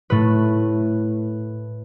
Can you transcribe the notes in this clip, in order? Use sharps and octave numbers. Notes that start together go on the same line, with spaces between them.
A2 A3 B4